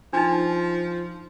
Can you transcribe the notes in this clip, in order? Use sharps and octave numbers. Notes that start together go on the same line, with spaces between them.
F3 D4 D#4